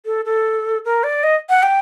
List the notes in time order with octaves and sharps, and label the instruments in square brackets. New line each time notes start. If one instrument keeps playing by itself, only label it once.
[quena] A4
A4
A#4
D5
D#5
F#5
G5